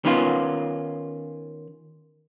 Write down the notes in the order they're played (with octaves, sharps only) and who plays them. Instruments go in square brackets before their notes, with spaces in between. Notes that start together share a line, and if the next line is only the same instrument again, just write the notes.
[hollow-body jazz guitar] D#3 B3 C#4 F4